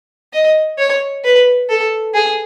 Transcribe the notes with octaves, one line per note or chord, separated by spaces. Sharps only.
D#5
C#5
B4
A4
G#4